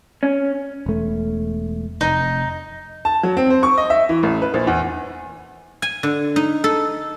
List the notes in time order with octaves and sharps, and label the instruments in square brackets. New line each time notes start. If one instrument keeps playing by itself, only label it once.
[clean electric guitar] C#4
[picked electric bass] E1 A3
[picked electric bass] F1 [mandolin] D#4
[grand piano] A5
F#3
C4
C5
C#6
D#5
E5
E3
A1
B4
A#1
E2
[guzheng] G#5
D3
D#4
A4